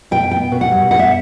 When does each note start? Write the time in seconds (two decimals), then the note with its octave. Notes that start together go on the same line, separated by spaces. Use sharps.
0.11 B2 G5
0.31 B3 G5
0.52 B2
0.61 F#5
0.71 G3
0.91 B2 F#5
0.99 E5